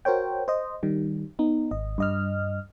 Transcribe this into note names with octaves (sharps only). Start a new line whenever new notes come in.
F#4 A#4 C5 C#5 G5
C5 D#5
D#3 G3
B3 D#4
G#1 D#5
G2 D#5 F6